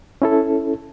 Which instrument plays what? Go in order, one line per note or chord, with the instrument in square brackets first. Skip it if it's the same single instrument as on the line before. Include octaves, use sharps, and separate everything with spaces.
[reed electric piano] C#4 E4 A4